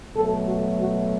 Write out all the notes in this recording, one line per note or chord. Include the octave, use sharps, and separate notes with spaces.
B2 F#3 A3 A4
F#4
F#4